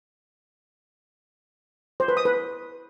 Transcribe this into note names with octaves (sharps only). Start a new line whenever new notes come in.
C5
B4
D#6
B4